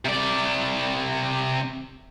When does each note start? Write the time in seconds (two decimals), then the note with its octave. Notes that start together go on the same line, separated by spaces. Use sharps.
0.05 C3 D5